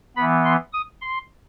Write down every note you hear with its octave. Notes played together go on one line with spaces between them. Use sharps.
E3 B3 B5
C6
D#6
C6